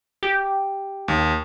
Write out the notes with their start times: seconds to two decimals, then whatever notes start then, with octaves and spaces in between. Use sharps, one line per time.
0.23 G4
1.08 D#2